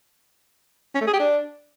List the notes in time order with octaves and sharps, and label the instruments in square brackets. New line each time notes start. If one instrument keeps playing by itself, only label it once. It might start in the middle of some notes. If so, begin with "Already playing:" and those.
[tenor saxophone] C#4
A3
G#4
G4
D4